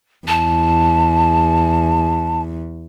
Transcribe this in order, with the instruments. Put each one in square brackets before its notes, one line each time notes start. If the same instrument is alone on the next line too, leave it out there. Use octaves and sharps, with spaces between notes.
[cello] E2 [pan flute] A5